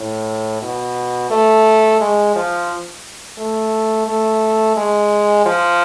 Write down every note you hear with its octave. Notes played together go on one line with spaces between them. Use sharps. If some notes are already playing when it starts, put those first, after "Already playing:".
Already playing: A2
B2
A3
G#3
F3
A3
A3
G#3
F3